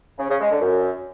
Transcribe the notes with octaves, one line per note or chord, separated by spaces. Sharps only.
C#3
C#3
G#3
D3
F#2